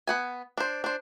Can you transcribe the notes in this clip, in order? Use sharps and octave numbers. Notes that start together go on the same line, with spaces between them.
B3 F#5 G#5
D4 C5
D4 C5